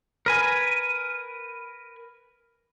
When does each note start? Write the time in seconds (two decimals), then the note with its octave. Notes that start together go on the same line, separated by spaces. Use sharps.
0.26 A#4 B4 G#5